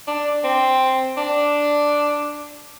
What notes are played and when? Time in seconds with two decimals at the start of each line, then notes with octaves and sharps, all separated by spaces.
0.08 D4
0.44 C4
1.17 D4